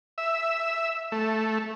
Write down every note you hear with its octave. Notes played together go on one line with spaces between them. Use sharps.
E5
A3